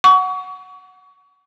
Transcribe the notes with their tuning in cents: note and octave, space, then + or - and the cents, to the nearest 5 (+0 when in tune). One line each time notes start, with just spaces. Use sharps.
F#5 +0 C#6 +35